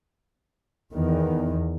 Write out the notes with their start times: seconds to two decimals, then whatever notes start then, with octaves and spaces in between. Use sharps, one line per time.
0.93 E2 D#3